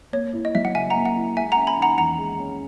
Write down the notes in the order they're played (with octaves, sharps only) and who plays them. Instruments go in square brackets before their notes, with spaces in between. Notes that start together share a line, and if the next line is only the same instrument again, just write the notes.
[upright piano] A#3 [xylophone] C#5
[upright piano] E4
[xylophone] D#5
[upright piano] F#3 [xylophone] E5
[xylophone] F#5
[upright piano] C#3 [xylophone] E5 G#5
[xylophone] F#5 A#5
[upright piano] A#3
[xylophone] F#5
[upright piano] E4
[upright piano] G#3 [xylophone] E5 G#5
[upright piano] C#4 [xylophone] F#5 A#5
[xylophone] G#5 B5
[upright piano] D#3 [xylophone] F#5 A#5
[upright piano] E2 [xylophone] F#5 A#5
[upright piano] G#3
C#4